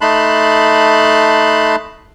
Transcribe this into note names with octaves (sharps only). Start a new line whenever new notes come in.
A3 D#4 A5 B5 C6 F#6